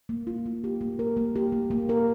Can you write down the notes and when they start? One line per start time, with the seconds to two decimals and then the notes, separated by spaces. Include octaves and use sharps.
0.09 A#3
0.27 F4
0.46 A#3
0.64 G4
0.81 A#3
0.99 A#4
1.17 A#3
1.36 G4
1.52 A#3
1.71 A#3
1.89 A#4